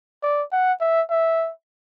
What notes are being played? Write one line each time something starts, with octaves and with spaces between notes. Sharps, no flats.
D5
F#5
E5
E5